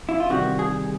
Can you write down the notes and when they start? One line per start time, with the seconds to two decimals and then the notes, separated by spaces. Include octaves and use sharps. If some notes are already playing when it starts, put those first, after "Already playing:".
0.09 E4
0.20 F4
0.30 C3 D#3 G3 F#4
0.59 G#4